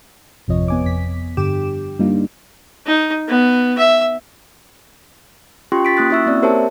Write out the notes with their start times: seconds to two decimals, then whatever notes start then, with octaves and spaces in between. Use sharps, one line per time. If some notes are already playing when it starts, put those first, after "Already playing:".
0.48 G#1 F2 C3 F3 C#5 D#5
0.68 B3 G#5 D6
0.85 F2 B6
1.37 G2 D3 G4 G5 D6 E7
1.99 G2 G3 A#3 D4 D#4 F4
2.86 D#4
3.28 B3
3.78 E5
5.72 C#4 F4 G4 G5 C6 C#6
5.85 A6 B6 D7
5.97 A#3 C#4 D#6 F#6 A6
6.10 C#4 E4 F#4 E5 C#6 E6
6.26 A#3 C4 D5
6.42 G4 A#4 C5 C#5 E5 A5